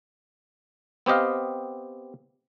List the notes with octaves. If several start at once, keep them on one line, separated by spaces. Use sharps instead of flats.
B3 C4 G4 D#5 F5